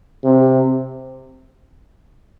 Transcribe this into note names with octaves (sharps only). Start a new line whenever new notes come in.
C3